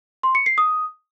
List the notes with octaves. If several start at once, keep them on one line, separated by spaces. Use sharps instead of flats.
C6
C#7
C7
D#6